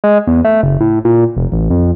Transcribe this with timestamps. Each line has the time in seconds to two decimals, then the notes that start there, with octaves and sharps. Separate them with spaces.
0.04 G#3
0.27 E2
0.45 A3
0.63 F#1
0.81 A2
1.05 A#2
1.37 F1
1.52 A1
1.70 F2